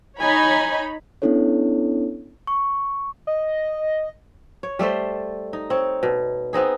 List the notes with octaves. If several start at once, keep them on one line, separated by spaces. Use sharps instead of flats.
D#4 C#5 G#5 B5
B3 C#4 D4 E4 A4 C#5
C#6
D#5
C#5
G3 A3 A4 C5
D#4
C4 C#5
B2
B3 C4 D#4 G#4